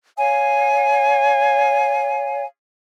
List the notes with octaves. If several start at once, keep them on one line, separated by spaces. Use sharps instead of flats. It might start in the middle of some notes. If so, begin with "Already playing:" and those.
C#5 F5 G#5